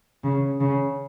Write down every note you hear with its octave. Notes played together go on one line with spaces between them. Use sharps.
C#3
C#3